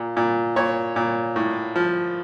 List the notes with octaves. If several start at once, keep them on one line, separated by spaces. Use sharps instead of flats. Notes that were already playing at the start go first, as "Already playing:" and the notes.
Already playing: A#2
A#2
A#2 C#5
A#2
A2
F3